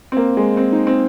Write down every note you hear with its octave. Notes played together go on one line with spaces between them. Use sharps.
C4
A#3
G#3
C4
D#4
C4